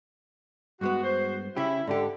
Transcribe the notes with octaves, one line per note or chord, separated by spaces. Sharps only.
G2 G#3 B3 F#4
F#4 C5
C#3 C#4 E4 G4
G#2 D3 G4